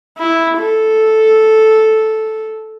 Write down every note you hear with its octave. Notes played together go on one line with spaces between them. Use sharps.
E4
A4